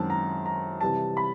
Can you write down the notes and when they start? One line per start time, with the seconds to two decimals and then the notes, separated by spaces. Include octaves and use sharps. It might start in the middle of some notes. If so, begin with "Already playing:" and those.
Already playing: F#2 D#3 G#3 C4 A5
0.10 A#5
0.46 A#5
0.81 C3 E3 G3 A5
1.17 B5